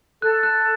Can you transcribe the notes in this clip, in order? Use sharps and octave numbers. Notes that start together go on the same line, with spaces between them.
A4 F#6
F#6